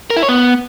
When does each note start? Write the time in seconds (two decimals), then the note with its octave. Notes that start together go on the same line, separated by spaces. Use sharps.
0.10 A#4
0.17 E4
0.23 C#5
0.29 B3